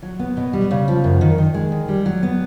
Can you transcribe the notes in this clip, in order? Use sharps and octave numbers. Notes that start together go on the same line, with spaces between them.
F#3
B3
B2
G3
C#3
F3
F#2
D#3
D#3
G#3
D#3
G3
F#3
B3